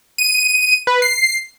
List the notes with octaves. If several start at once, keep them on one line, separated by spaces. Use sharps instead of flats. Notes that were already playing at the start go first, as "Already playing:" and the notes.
D#7
B4
C7